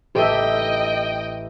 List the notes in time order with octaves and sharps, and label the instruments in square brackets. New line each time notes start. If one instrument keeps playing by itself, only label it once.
[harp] A1 [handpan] G4 A4 E5 [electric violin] D#5 G5